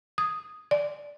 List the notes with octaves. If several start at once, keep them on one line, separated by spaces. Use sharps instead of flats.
D#6
D5